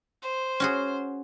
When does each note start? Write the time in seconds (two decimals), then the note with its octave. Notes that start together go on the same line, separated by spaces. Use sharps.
0.22 C5
0.60 C#4 F#4 G#4